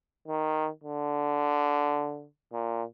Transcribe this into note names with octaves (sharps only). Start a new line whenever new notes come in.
D#3
D3
A#2